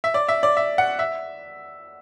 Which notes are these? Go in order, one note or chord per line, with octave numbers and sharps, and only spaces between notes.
E5
D5
E5
D5
E5
F#5
E5